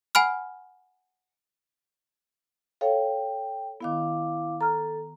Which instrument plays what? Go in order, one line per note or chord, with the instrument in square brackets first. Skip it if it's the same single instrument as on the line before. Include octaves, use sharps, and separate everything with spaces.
[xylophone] F#5 G#5 B5 F6
[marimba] A4 C#5 F5 [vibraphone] G5
[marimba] D#3 B3 [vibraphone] E4 F5 D6
[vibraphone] A4 [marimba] A#5 F6